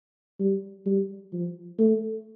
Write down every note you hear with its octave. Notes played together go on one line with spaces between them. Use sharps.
G3
G3
F3
A3